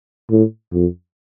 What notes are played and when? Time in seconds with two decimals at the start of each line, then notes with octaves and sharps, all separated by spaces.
0.31 A2
0.73 F2